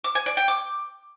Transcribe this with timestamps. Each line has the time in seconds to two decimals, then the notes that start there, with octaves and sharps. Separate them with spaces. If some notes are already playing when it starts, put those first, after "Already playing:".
0.04 D6
0.15 G#5
0.26 D5
0.37 G5
0.48 D6